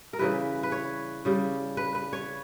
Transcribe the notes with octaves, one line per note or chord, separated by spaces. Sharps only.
A#4
C#3 E3 G3 B4
B4
C#5
C#3 G3
B4
B4
C#5